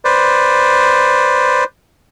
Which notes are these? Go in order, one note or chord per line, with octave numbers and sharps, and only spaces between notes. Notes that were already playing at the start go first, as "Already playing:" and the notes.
B4 C5 D5